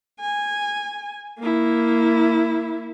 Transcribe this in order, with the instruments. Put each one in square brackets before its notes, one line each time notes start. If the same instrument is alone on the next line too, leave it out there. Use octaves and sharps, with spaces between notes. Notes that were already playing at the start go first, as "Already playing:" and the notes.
[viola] G#5
A#3 E4